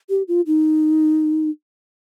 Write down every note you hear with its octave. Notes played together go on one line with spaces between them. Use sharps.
G4
F4
D#4